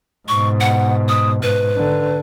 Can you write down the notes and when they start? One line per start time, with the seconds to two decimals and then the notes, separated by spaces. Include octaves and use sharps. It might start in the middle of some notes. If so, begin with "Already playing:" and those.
0.28 G#2 B2 C#6
0.60 F#5
1.08 D#6
1.43 G#2 B4
1.77 D3